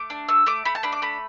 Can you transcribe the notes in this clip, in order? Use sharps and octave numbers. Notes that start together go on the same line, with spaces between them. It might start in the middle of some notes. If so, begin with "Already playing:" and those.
Already playing: A3 D6
D4
A3 E6
A3 D6
A3 B5
A5
D4 B5
D6
A3 B5